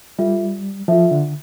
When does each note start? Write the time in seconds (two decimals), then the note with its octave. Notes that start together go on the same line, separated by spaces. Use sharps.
0.18 G3 F4 A4 E5
0.88 F3 F4 A4 E5
1.11 D3